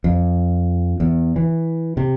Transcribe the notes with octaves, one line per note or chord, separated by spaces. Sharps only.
F2
E2
E3
C3